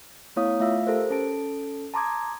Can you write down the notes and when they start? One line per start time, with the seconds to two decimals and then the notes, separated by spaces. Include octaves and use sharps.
0.36 A3 B3 E4 C#5 F5 D#6
0.60 A3 F4 E5 F5 E6
0.87 G4 A4 A#4 C5
1.10 C#4 A4 A5 D7
1.94 A5 A#5 C6 D6 D#6 G#6